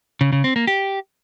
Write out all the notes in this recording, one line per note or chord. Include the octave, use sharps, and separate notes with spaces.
C#3
C#3
C4
A#3
G4